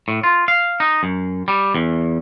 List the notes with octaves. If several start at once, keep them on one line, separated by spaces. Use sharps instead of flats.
A2
F4
F5
D#4
F#2
G3
E2